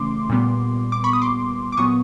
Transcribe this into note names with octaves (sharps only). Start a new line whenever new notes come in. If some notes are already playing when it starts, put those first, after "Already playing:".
Already playing: C#3 E3 A3 C#4 C6 D6
A#2 G3 B3
D6
B5 C#6
D#6
C6 D6
D6
A#2 F#3 B3 C#6 D#6